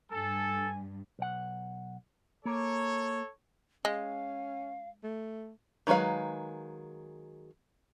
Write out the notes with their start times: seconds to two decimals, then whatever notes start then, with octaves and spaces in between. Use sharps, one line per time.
0.11 G2 A4 G#5
1.19 B1 F#5
2.45 A#3 A4 C#5
3.85 G#3 C#4 F5
5.04 A3
5.87 D#3 F#3 G#3 B4 F5